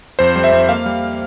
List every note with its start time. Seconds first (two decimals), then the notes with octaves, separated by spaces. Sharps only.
0.19 F2 C5
0.36 G3
0.44 E5
0.52 F2
0.69 A#3 F5
0.86 G3